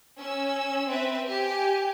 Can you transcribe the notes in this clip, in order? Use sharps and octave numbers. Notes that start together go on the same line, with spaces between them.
C#4 E6
C4 B4 E5
G4 G#5